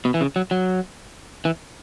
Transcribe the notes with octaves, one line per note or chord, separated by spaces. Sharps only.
B2
E3
C#3
F#3
F#3
E3